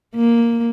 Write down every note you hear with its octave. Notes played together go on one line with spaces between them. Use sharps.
A#3